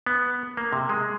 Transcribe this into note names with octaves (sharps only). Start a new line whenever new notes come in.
B3
A#3
C3
G#3